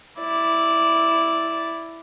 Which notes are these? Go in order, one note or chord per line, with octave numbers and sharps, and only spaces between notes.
E4 D5